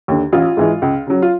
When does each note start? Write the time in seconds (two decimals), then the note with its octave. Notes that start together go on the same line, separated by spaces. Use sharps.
0.08 D#2 D3
0.33 A1 F4
0.57 G#2 E3 G#3
0.82 C#2
1.07 C#3 F#3
1.22 F4